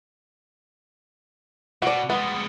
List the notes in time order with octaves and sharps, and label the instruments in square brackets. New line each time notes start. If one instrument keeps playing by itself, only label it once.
[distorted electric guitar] B2 [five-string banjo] F#4 D5
[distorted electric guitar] G3 G#3 [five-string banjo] B3